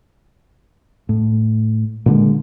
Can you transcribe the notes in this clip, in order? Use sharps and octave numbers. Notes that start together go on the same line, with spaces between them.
A2
A#2 D3 G#3